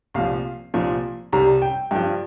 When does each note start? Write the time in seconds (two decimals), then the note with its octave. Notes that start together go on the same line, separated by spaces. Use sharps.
0.14 C2 A#2 F3 F5
0.74 C2 A#2 F3
1.32 C2 C3 G3 A#5
1.62 G5
1.91 G2 G5
1.95 F3